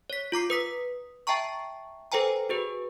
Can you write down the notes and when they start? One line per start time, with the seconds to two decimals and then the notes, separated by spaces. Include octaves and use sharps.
0.10 C#5 B6
0.32 F4 A#5 D6 C7
0.50 B4 D#6 B6
1.27 E5 G5 A5 A#5 C#6
2.12 A4 B4 C5 G5 G#5 A#5
2.49 F#4 G#4 B4